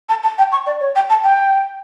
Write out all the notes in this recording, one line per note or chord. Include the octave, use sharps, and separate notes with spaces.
A5
A5
G5
C#6
D5
C#5
G5
A5
G5